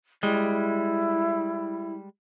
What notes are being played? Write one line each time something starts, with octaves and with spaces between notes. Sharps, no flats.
G3 G#3 E4